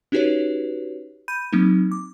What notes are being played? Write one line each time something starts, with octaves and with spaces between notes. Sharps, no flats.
C#4 D#4 F#4 G4 B4 C#5
B5 G6 D#7
F#3 A#3 C4 D#4
D6